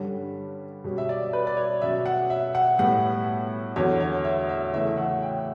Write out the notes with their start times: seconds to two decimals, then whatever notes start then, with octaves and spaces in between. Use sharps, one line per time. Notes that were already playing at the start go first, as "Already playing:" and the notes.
Already playing: G2 D3 G3 C#4
0.84 B2 G3 C#4
0.98 E5
1.09 D5
1.33 B4
1.47 D5
1.57 C#5
1.82 B2 F#3 C#4 E5
2.06 F#5
2.30 E5
2.55 F#5
2.78 A2 G3 B3 F#5
3.76 E2 D3 F#3 C#5
4.00 C#5
4.25 E5
4.49 E5
4.73 C#3 E3 A3 C#4 E5
4.97 F#5
5.22 G5